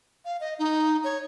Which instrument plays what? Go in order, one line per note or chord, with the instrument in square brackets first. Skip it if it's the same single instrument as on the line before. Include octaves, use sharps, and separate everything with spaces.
[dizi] F5
D#5
D#4
C#5